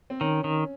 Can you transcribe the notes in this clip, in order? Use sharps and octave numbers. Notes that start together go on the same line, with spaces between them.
C4
D#3 C#4
D#3